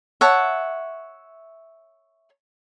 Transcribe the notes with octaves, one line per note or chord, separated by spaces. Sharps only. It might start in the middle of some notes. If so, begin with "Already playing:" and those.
C#5 E5 F#5 A5